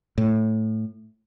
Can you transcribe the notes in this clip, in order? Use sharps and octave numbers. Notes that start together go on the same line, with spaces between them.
A2